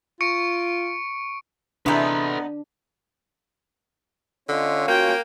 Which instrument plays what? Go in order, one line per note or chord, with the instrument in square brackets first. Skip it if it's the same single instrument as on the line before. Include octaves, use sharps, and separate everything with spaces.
[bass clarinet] F4 [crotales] C#6 C#7 D7
[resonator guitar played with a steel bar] C3 E3 G#4 [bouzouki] B3 D#4 [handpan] D4 [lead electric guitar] A4 B4
[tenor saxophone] D3 [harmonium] C#4 F4 C#5 [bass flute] D#5
[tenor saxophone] A#3 [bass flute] F#4 [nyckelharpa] G5